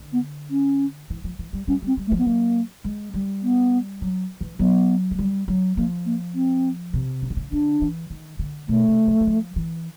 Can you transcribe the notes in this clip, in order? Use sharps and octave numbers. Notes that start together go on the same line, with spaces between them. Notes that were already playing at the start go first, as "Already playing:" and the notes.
Already playing: D3
B3
C#4
E3
F3
E3
G3
G3 C#4
G3 C4
G3
A3
F3
B3
F#3 A#3
G#3
G3
B3
F#3
E3
F#3 B3
G#3
G3
F#3
F3 A#3
A#3
C4
C3
C#3
D3
C#3
D3 D4
E3
D#3
D3
B2 A3
C3
F3
E3
F3
E3